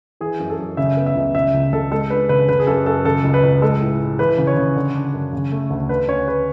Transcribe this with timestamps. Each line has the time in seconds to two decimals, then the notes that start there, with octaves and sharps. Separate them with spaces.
0.21 E3 G#4
0.40 F#2
0.49 A4
0.59 F#2
0.77 C#3 E5
0.97 B3
1.06 E5
1.15 C#2
1.35 C#3 E5
1.54 C#2
1.72 C#2 A4
1.92 G#3 A4
2.10 D4 B4
2.29 C#3 B4
2.49 C#3 B4
2.59 G#4
2.67 F#2 A4
2.86 F#2 A4
3.05 C#3 A4
3.24 C#2
3.34 B4
3.43 C#2
3.62 G#3 A4
3.81 A2
4.00 A2
4.19 E3 B4
4.38 C#3
4.47 C#5
4.57 C#3
4.76 D3
4.95 D4
5.13 F#2
5.33 C#3
5.52 A3
5.70 D2
5.89 D3 B4
6.08 C#4 C#5
6.28 B4